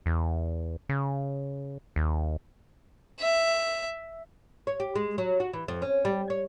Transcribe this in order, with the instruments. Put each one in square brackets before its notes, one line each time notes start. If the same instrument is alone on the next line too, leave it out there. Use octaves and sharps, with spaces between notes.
[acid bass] E2
C#3
D#2
[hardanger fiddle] E5
[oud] C#5
G4
G#3
F#3
F#4
E3
F2
C#4
G3
C#5